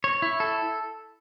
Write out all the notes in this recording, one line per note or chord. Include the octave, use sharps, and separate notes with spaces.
C#5
E4
A4